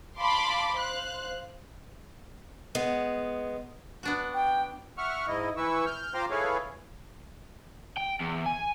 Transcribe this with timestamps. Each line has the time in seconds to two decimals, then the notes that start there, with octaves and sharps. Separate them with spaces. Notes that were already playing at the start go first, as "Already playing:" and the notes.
0.18 F5 A5 B5 C6 D6
0.75 C5 F5 F#6
2.75 G#3 B3
4.03 B3 D4 F#4
4.34 G5
4.98 E5 F#5 C#6 F6
5.27 G#2 E4 D#5
5.57 E3 E4 B4 C#6 E6
5.86 F6 G6
6.14 F4 C5 G5 A#5 C6 D6
6.31 E4 G#4 A4 B4 C#5 F5
7.97 G5
8.21 E2
8.46 G#5